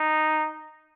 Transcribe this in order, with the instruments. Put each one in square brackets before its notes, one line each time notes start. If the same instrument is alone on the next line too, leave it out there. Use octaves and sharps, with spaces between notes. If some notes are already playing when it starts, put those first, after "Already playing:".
Already playing: [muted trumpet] D#4